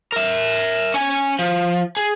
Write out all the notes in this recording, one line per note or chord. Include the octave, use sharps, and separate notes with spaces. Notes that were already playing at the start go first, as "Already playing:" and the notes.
A#4 E5
C#4 G#5
F3
G#4